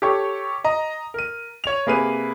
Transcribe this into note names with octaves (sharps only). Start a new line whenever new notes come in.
G4 A4 C#5 G5 C#6
D#5 A#5
A#4 D#7
C#5 F7
C3 A#3 G#4 B4 C7 D#7